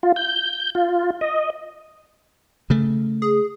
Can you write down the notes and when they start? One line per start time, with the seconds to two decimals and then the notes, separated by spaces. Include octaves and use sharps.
0.03 F4
0.16 G6
0.75 F4
1.21 D#5
2.70 C#3 A3
3.22 G#4